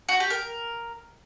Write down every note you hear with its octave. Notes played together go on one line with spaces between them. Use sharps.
F#4
G4
A#4